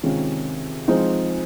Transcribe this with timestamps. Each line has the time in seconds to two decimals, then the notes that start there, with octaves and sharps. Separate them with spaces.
0.03 C3 D#3 G#3 C#4 F4
0.88 F3 G#3 C4 D#4